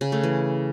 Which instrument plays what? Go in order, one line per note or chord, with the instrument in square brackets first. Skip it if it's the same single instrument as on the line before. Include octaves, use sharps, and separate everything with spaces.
[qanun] C#3
A3
E3